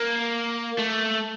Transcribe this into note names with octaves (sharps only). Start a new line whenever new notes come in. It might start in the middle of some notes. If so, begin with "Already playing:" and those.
Already playing: A#3
A3